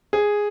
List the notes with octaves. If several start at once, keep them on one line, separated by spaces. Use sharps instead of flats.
G#4